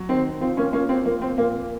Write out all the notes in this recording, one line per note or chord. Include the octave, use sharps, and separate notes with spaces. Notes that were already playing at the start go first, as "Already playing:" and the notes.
Already playing: F#3
D#3 C4
F3 C4
A#3 C#4
F3 A#3 C#4
C4
F3 A#3
C4
A#2 A#3